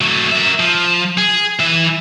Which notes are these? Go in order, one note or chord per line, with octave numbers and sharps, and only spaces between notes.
F#3 A3
A#4 E5
F3
G#4
E3 E5